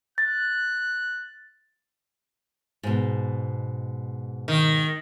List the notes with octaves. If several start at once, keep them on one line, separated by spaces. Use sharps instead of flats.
F#6 A6
G#2 B2
D#3